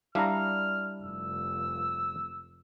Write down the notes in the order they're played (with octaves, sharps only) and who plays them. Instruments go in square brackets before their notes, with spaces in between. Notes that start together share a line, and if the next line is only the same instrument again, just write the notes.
[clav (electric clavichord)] G3 D4 E4 [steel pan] F5 A#5 [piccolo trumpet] F6
[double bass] F1 [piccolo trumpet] E6